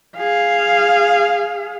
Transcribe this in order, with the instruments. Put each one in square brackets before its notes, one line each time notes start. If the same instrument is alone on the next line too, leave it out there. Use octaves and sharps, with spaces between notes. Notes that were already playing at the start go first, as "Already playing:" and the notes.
[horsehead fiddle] G#4 F5